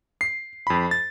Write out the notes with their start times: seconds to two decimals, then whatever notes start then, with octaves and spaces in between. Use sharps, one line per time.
0.21 C7
0.67 F2 B5
0.91 A6